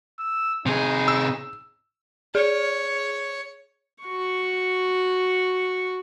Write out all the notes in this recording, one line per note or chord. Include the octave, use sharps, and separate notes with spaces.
E6
C3 D#4 G#4
E6
G#4 C#5
F#4 C#6